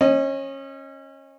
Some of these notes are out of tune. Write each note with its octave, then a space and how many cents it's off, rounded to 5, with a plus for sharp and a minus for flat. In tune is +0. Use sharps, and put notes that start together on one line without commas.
C#4 -25 D#5 +0